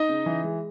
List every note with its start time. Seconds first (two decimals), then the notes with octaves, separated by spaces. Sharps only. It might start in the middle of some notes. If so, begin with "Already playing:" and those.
Already playing: D#4 D#5
0.09 C#3
0.26 E3
0.43 G#3